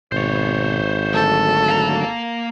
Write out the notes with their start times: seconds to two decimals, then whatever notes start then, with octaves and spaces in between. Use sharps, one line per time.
0.12 G#1 B2 C5 C#5
1.13 D3 F#3 A3 A4
1.69 A#3 A#5